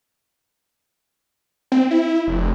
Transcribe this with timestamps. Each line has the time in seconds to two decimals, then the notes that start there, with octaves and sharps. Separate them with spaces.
1.72 C4
1.91 E4
2.27 F1